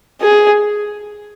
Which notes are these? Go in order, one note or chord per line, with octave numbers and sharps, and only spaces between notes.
G#4